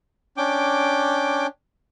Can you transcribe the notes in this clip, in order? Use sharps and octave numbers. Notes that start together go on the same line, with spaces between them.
C#4 D4 G5 D6